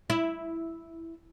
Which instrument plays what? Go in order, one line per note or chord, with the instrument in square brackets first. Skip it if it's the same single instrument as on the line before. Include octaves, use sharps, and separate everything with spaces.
[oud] E4